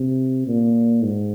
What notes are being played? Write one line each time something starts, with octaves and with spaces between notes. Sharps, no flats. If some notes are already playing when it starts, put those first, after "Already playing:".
Already playing: C3
A#2
G#2